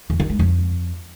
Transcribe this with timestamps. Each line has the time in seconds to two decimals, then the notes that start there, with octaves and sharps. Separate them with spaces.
0.10 E2
0.20 D#3
0.29 G#3
0.39 F2